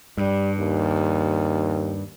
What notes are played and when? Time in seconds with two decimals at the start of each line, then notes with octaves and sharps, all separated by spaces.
0.17 G2 G3
0.58 D#2